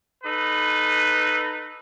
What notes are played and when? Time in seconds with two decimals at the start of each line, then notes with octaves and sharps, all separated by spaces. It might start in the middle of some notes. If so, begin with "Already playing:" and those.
0.24 D#4 A4 B4